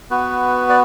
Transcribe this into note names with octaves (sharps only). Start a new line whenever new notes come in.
B3 F#4 B4
D5